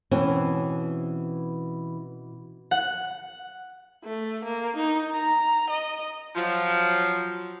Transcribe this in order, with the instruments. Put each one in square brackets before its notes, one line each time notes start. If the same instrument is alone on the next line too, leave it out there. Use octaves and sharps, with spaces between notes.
[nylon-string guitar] B2 C4 C#4 [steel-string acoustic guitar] E3
[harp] F#5
[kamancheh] A3
A#3
D#4
A#5
D#5
[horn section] F3 F#3